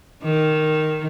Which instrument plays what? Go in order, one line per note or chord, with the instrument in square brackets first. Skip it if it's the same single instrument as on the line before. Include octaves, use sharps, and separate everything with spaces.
[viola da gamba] D#3